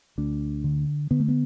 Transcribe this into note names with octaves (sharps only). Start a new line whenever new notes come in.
D2 D4
D3
D3 B3
A3
B3